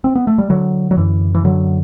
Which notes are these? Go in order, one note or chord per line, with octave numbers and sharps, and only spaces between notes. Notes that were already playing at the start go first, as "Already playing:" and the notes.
C4
B3
A3
G3
D3 F#3
F#3
F#2 E3
E3
D3 F#3